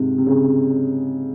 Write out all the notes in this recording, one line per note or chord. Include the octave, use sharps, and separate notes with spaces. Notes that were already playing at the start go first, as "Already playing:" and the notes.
Already playing: G#2 C3
C3
C#3